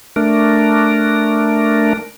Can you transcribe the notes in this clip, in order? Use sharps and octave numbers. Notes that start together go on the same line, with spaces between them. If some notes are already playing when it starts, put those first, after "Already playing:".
A3 D4 A#4